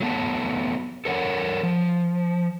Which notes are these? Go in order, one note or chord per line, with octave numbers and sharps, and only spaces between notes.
F#3 A3 B3 A5
A4 A#4 C#5 F#5
F3